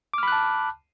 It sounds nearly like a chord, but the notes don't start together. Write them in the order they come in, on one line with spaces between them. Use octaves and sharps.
D6 F6 B5 F#6 A5